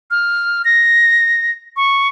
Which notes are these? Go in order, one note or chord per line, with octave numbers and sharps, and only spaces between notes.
F6
A#6
C#6